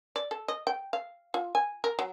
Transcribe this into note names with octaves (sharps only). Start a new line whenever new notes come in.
D5
A4
D#5
G5
F5
F4
G#5
A#4
F#3